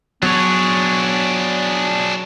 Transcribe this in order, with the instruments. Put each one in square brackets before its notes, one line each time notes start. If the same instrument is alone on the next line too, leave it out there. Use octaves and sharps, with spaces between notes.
[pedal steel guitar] F#3 C#5 [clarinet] B3 [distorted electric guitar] D4 G#4